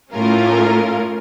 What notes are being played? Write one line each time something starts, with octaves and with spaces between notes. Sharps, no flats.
A2 A3 C#4 F4 A#4